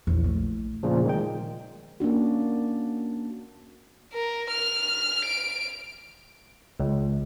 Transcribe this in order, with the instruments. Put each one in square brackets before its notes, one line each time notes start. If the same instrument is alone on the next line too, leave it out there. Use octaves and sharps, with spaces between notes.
[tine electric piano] A#1 [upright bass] E2
[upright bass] A3
[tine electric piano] A#2 C#3 F3
D#3 G#3 G5
[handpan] A#3 C#4 D4 F#4
[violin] A#4
F6
D7
[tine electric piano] C#2